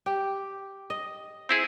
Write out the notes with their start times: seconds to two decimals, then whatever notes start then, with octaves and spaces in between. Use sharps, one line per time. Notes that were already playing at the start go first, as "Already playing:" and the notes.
0.06 G4
0.90 D#5
1.49 C4 E4 G#4